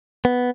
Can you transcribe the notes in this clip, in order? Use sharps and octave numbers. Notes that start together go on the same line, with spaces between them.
B3